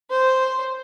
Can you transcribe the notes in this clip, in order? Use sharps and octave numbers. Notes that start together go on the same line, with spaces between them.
C5